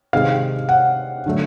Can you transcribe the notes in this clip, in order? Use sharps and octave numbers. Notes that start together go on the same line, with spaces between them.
C3 D#3 G#3 F5
F#5
D3 F#3 A3